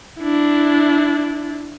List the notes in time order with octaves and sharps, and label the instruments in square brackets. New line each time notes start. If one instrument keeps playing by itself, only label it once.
[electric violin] D4 E4